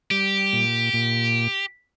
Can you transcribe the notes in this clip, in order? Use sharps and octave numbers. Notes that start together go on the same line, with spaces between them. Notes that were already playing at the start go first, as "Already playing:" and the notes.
G3 G4
A#2
A#2